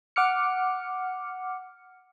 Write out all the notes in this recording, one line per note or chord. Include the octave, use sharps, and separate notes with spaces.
F#5 D6 F6 C#7